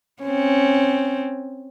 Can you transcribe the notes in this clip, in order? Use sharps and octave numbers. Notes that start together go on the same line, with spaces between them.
C4 C#4